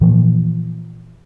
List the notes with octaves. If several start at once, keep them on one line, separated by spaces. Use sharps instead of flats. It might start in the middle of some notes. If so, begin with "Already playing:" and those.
A#2 E3 F3 A#3